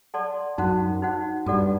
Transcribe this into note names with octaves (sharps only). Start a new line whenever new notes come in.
A4 D5 F#5 A5 C6
F#2 D#4 F#4 C5 F#5
D#4 F#4 C5 F#5
G2 F#4 A4 D5 F#5